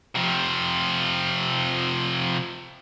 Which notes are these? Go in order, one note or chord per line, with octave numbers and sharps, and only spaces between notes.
C3 F3